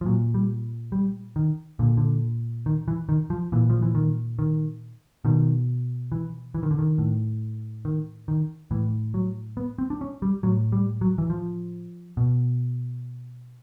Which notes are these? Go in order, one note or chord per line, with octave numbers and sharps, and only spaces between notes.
F3
A#2 F#3
G3
G3
D#3
A#2 D3
D3
D#3
E3
D#3
F3
A#2 E3
F3
E3
D#3
D#3
B2 D#3
E3
E3
D#3
D3
D#3
A2
D#3
D#3
A2 E3
F#3
B3
C4
D4
C#4
G3
A2 F#3
G3
F#3
E3
F3
B2